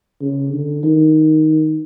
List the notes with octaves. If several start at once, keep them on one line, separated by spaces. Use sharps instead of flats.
C#3
D3
D#3